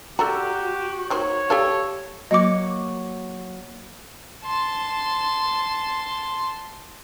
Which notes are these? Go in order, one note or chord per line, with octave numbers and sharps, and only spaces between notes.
F#4 G4 A4 D5 A#5
D#3 A#3 C5 C#5
G4 A4 D5 F5
F#3 A#3 D#5 C#6 D6
A5 C6